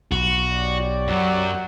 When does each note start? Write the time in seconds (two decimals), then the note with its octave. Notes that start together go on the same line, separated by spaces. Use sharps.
0.11 B1 F#4
0.51 G4 C#5 D5
1.08 F#2 F#3